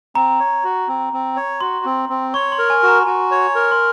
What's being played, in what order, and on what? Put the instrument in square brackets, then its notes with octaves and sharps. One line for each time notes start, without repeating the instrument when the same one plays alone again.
[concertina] C4 [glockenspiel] A#5
[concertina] C#5
F#4
C4
C4
C#5
[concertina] F#4 [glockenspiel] C6
[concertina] C4
C4
[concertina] C#5 [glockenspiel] C#6
[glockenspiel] C6
[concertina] A#4
[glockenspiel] G#5
[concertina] F#4
[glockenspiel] A#5
[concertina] F#4 [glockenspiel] G#5
[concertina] C#5
A#4
[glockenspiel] C6